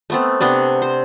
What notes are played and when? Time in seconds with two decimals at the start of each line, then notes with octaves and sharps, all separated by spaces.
0.10 A3 B3 C4
0.41 C3 B3 C4 D4
0.82 C5